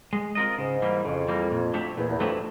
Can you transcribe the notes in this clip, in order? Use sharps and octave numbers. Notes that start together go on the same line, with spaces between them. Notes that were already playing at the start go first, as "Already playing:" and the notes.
G#3
C4 F4 A#4 D#5
G#2 C#3
E3 G3 A#3
F2 C#3
E3 G3 A#3
A#2
F#3 A3 D4 G4
E2 A#2
E2
F2 F#3 A3 D4 G4